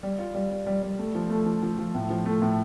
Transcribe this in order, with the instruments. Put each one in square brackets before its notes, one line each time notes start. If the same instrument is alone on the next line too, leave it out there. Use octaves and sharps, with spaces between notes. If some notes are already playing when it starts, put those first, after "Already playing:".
[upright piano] G3
F4
G3
G3
G3
G3
A3
F3
A3
F3
F3
F3
A2
F3
A3
A2